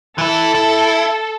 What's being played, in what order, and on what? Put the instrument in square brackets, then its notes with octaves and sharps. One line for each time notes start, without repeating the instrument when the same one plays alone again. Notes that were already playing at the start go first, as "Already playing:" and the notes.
[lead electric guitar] E3 E4 [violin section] A4
[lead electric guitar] E4